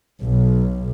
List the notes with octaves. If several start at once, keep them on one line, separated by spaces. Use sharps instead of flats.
B1